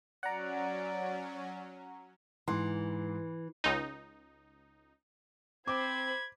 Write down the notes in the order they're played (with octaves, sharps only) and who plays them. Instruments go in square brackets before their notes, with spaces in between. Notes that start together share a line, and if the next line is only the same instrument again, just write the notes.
[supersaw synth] F#3 C#4 [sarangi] D5 [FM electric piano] F#5 A#5
[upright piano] G#2 C6 [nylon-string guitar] E3
[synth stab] C#2 D#4
[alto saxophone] C4 [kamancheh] C5 B5 [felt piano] D6 [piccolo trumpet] G#6